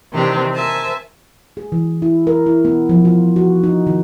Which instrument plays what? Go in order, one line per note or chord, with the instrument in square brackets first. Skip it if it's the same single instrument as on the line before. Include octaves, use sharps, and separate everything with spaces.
[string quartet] C3 D#3 E3 C4 D4 G4
A#4 C5 E5 G#5 A5
[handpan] G#4
E3
E4
A#4
E4
B3
F3
F4
F#4
D#4
D#3